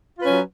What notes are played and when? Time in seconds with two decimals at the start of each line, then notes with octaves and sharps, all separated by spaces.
0.19 F4
0.21 B4
0.24 C#4
0.27 F#3